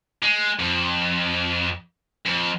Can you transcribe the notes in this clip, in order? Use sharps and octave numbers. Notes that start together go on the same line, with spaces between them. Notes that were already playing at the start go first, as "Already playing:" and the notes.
G#3
F2
F2